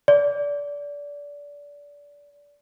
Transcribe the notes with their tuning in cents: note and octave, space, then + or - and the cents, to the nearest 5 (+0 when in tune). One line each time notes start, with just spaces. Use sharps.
D5 -25